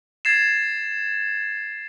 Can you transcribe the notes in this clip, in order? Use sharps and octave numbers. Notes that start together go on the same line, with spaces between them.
G#6 A6 C7 E7